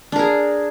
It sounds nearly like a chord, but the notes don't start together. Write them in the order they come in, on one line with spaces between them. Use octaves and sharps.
D4 A#4 G#4